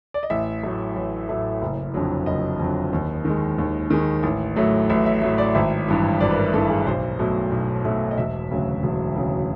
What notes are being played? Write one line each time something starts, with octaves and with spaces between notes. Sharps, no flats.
D5
D#5
A1 E5
A2 F#3 A3 E5
A1
A2 F#3 A3
F#1
F2 D3 F#3
F#1 D#5
F2 D3 F#3
D#2
D#3 G#3
D#2
D#3 G#3
A1
A2 F#3 A3
A1 E5
E5
A2 F#3 A3
D5
G#1 E5
G2 E3
G#1 D5
B4
A#4
G2 E3 A4
G#4
B1 C5
B2 F#3 A3
B1
B2 F#3 A3
D#5
E1 E5
D2 C#3 F#3
E1
D2 C#3 F#3